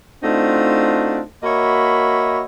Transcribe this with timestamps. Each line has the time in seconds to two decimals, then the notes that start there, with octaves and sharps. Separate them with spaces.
0.23 A3 C4 D4 D#4 F4 F#4
1.43 A#3 F#4 C#5 D#5 E5 B5